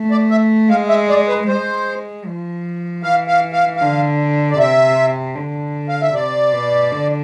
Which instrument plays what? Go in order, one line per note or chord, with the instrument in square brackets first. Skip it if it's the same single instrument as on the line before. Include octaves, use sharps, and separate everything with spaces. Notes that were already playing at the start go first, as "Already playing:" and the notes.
Already playing: [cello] A3
[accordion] D5
E5
[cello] G#3 [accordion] F5
[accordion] E5
D5
B4
[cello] G#3 [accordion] C5
[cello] F3
[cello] E3 [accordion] F5
[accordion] F5
F5
[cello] D3 [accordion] F5
[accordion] D5
[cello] C3 [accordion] E5
[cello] D3
[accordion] F5
E5
[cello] C3 [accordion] D5
[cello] B2
D3